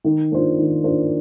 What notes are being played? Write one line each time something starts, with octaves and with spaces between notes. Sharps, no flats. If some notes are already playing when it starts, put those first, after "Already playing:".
D#3
A#3 D4 F4 C5
D#3
A#3 D4 F4 C5